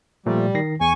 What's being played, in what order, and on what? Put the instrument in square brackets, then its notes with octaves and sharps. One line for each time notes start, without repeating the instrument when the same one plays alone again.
[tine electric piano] A#2 F3 A3 [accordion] G3
[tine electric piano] D#3 A#6 C7
[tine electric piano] E2 [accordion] G#5 C#6